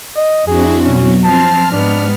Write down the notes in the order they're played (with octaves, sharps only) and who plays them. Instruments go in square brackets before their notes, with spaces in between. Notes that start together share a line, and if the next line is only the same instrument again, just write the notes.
[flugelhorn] D#5
[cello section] F2 F#4 [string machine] C4 D4 E4 [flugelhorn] G#4
[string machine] B2 F#3 [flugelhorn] C#4
[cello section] F3 C4 [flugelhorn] A5 [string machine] F6
[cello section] G#2 G3 B3 [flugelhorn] D4